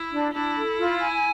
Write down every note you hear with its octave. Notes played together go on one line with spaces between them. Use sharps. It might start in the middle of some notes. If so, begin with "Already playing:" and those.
Already playing: E4
D4
D4 E4
A4
F4
G#5